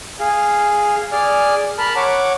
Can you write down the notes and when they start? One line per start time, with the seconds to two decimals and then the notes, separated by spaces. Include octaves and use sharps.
0.20 G#4 F5
1.12 G#4 D5 F6
1.78 A#4 A5 B5 F6
1.96 C#5 F#5 D6